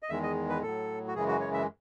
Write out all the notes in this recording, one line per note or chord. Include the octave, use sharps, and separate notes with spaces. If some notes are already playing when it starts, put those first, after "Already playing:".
D#5
E2 D#3 G#3 E5
D#5
B4
A2 F#3 A4
F#4
F#2 C#3 E3 G#3 G#4
F#4
C#5
E5